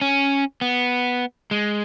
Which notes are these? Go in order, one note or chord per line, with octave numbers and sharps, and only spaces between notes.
C#4
B3
G#3